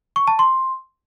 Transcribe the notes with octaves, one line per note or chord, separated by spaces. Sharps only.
C#6
A5
C6